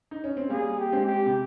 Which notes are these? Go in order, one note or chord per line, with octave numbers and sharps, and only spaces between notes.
D#4
C#4
C4
G3 A#3 G#4
G4
G#3 C4
G4
C3